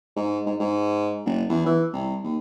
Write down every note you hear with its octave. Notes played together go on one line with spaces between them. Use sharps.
G#2
G#2
G#2
F#1
E2
E3
C2
D#2